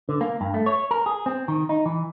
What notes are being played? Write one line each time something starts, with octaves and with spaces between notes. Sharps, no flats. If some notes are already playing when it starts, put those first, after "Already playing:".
D3
A#3
G2
A3
C#5
A#4
G#4
C4
D#3
D#4
E3